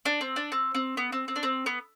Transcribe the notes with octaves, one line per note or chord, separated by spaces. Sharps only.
D4
C4
D4
C4
C4
B3
C4
C4
D4
C4
B3